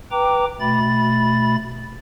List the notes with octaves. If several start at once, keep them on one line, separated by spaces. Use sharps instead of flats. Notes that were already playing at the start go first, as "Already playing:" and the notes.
B4 G5 A#5 D6
B2 A3 B5 A6